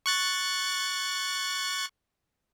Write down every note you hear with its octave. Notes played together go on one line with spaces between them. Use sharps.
C#6 F#6 A6